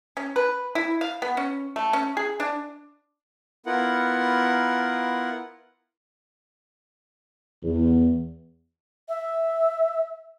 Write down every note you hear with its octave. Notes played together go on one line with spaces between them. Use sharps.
C#4
B4
E4
F5
B3
C#4
A3
C#4
G#4
D4
B3 E4 F4 A#4 F#5
E2
E5